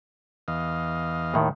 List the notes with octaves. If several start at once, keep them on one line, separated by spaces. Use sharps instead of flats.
E2 D#5 F5
D#2 A2 D#3